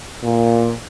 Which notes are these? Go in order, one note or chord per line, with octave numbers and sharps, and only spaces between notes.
A#2